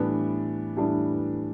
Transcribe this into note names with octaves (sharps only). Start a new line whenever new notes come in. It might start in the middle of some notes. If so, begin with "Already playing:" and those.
Already playing: A2 E3 G3 B3 D4
A2 E3 G3 B3 D4